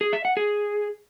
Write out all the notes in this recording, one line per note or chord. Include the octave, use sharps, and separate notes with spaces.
G#4
E5
F#5
G#4